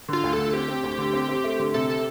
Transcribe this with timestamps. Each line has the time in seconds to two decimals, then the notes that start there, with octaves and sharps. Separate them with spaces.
0.08 D3 F4
0.23 D2
0.33 D3 A4
0.53 C4 G4
0.68 C4
0.83 D2
0.98 D3
1.13 C4
1.29 C4
1.44 A3
1.59 D3
1.74 C3 A4
1.90 A4